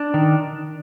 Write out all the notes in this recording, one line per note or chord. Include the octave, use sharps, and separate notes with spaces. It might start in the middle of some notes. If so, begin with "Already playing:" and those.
Already playing: D4
D#3